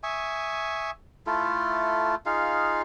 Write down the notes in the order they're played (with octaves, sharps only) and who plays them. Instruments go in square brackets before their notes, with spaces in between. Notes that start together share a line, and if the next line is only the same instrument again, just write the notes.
[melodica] E5 G#5 C#6 D#6
A3 E4 F4 A4
D#4 F4 G#4 F5